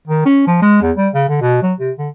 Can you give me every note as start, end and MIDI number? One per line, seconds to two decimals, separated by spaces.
0.07 0.25 51
0.25 0.42 61
0.47 0.58 53
0.62 0.79 56
0.82 0.91 40
0.97 1.09 55
1.14 1.24 49
1.29 1.37 50
1.41 1.62 47
1.62 1.73 54
1.80 1.91 48
1.98 2.09 50